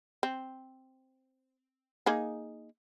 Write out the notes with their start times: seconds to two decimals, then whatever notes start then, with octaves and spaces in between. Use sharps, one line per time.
0.23 C4
2.06 A#3 D#4 G#4